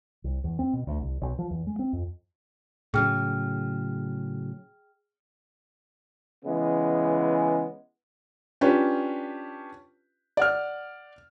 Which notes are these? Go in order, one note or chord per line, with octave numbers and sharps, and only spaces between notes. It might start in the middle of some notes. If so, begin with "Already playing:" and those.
C2
E2
C4
B2
D2
C2
B1
F3
E2
G#3
C4
F2
A2 C#3 F#3 G#4 G5 F6
C#3 E3 G#3 B3
C#4 D4 F4 G4 B4
D5 F#5 F6